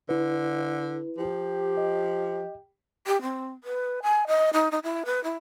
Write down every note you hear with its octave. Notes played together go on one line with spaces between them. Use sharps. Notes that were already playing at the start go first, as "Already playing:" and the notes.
D3 E4 B4
F3 G4
D#5
G4
C4
B4
G#5
D#5
D#4
D#4
E4
B4
E4